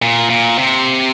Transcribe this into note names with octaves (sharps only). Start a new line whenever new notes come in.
A#2
A#2
C3